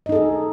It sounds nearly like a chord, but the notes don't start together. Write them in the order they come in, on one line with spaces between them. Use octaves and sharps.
D#5 D#4 A4 G#4